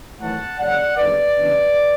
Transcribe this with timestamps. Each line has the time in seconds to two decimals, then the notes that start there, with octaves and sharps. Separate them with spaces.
0.20 G#1 F#2 E3 A3 C#4 F#5 A5
0.59 F#1 F#2 C#3 G#3 D5 F#5
0.97 F#1 E2 D3 B4 D5
1.36 E2 C#3 G#3 D4